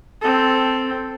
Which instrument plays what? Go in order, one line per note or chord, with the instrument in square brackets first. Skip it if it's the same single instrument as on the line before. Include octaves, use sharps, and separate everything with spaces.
[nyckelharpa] C4 A4